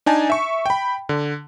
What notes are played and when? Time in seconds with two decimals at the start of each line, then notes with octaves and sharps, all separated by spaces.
0.06 D4 D#4 G#5 A5
0.30 E5 C#6
0.66 G5 B5
1.09 D3